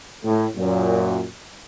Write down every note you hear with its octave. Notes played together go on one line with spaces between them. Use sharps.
A2
F#2 A#2